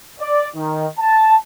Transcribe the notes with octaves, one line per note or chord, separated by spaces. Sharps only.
D5
D#3
A5